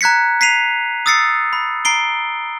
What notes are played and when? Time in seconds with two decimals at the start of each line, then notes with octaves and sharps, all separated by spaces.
0.01 A#5 F#6 G#6 B6 C#7
0.41 B6 C7 D#7 F7
1.06 D#6 E6 A6 C7 C#7
1.53 B5
1.85 A#5 C7 D7 G7